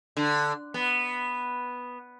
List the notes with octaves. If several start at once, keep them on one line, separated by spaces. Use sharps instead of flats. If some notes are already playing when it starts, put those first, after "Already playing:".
D3
B3